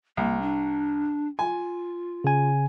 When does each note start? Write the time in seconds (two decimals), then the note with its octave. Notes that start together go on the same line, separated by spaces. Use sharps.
0.17 C2 A#3
0.41 D4
1.39 F4 G#5
2.24 C#3 G#5